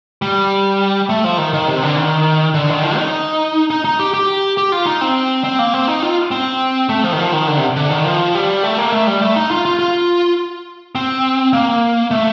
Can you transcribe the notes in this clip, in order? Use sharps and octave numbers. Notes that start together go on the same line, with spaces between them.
G3
A3
F3
D#3
D#3
C3
D3
D#3
D3
D#3
F3
D#4
D#4
D#4
G4
G4
G4
F4
D#4
C4
C4
A#3
C4
D#4
F4
C4
A3
F3
D#3
F3
D#3
D3
C3
D3
D#3
F3
G3
A3
A#3
A3
G3
A3
D#4
F4
F4
F4
C4
A#3
A3